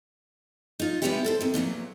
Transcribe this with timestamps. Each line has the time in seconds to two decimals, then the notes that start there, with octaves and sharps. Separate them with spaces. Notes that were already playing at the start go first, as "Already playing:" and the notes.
0.80 D#4 F4
1.02 G3 G#3 B3 E4 F#4 G4
1.24 A4 A#4 C5
1.41 D#2 C3
1.54 E2 A#2 E3 F#3